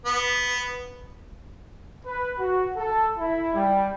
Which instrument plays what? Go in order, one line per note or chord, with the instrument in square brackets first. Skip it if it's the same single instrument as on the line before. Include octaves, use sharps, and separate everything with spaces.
[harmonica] B3
[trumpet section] B4
F#4
A4
E4
G3